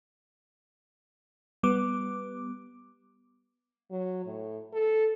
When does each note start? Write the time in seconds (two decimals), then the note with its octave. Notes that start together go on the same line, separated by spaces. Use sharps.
1.63 G3 B3 D6
3.91 F#3
4.26 A2
4.73 A4